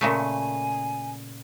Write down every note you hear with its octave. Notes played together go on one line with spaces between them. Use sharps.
A#2 C#3 A3 G#5